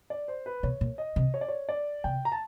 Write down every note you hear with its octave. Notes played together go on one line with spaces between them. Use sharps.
D5
C5
B4
B2 C#5
A#2
D#5
C3
C#5
D5
C#5
D5
C3 G5
A#5
A5